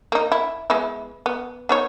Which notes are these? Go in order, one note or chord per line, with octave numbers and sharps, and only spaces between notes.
A#3 D#4
E4
G#3 B3 E4
B3
B3 D#4 C#5